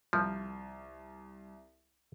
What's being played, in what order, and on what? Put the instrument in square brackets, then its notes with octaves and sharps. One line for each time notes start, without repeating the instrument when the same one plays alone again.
[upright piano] C2 [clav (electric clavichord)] F3